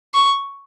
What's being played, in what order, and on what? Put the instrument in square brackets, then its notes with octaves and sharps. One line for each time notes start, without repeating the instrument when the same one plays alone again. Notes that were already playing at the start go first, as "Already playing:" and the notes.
[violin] C#6